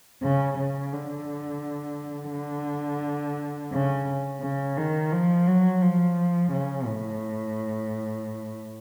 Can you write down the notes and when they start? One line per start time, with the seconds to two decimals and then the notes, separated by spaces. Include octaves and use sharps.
0.23 C#3
0.58 C#3
0.92 D3
2.33 D3
3.72 C#3
4.42 C#3
4.77 D#3
5.12 F3
5.47 F#3
5.82 F3
6.52 C#3
6.87 A2